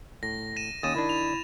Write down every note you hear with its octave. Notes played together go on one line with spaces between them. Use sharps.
A2 A#6
A#6 D#7 E7
D#2 C#4 D#6 A6 E7
D#3 D4 E4
F7